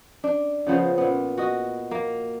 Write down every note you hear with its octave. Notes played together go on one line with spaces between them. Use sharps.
D4
C#3 F3 B3 C5
A#2 B3
F#4 D#5
A#3